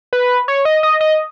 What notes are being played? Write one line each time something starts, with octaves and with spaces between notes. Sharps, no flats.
B4
C#5
D#5
D#5
D#5